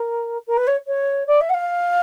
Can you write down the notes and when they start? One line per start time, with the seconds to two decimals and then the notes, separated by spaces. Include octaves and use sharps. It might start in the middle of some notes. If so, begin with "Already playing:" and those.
Already playing: A#4
0.47 A#4
0.57 B4
0.67 C#5
0.87 C#5
1.27 D5
1.41 E5
1.49 F#5
1.54 F5